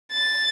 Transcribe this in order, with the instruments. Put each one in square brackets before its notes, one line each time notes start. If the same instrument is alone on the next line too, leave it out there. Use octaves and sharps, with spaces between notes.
[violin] A6